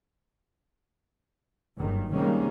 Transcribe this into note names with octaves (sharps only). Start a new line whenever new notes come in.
F#1 G2 D#3
C3 D#3 G3 G#3 A#3 C#4